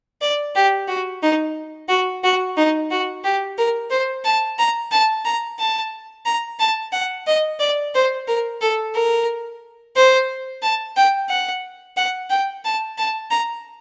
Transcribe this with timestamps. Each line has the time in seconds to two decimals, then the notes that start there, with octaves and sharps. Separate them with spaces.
0.22 D5
0.55 G4
0.88 F#4
1.23 D#4
1.89 F#4
2.24 F#4
2.57 D#4
2.91 F#4
3.24 G4
3.58 A#4
3.91 C5
4.25 A5
4.59 A#5
4.91 A5
5.25 A#5
5.60 A5
6.26 A#5
6.59 A5
6.93 F#5
7.27 D#5
7.60 D5
7.95 C5
8.28 A#4
8.61 A4
8.95 A#4
9.96 C5
10.62 A5
10.96 G5
11.29 F#5
11.97 F#5
12.30 G5
12.65 A5
12.98 A5
13.31 A#5